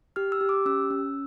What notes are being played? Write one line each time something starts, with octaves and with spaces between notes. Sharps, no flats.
G4 F6
E6
G4
D6
C#4 E6
C#4